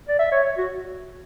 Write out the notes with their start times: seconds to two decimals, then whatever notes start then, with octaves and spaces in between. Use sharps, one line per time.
0.09 D5
0.19 E5
0.32 C#5
0.58 F#4